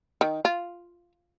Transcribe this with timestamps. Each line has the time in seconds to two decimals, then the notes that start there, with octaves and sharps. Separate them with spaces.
0.21 D#3
0.45 F4